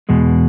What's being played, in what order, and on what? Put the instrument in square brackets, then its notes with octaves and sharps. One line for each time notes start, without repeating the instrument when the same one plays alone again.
[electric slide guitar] E2 B2 G#3